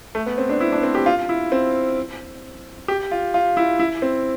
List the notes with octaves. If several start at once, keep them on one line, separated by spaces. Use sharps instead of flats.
A3
B3
C4
D4
E4
D4
C4
G4
F4
E4
C4
G4
F4
F4
E4
E4
C4